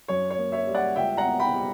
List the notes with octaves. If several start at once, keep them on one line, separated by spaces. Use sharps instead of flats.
F#2 C#5
C#5
A#3
C#5 E5
G3
D5 F#5
C#2 E5 G5
F#5 A#5
B3
G5 B5
G3